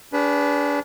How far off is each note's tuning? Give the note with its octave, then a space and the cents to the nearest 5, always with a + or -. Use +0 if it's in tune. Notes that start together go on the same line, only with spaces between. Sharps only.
D4 -30 G#4 -30 B4 +0